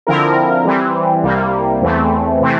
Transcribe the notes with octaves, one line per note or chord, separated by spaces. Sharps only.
D3 F3 C4 E4 A#4
E3 G3 C4
C2 C3 G3 A#3
E2 E3 A3 C4
C3 E3 A3 C4